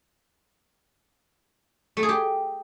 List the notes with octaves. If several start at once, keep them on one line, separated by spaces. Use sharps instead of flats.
A3
G#4
G4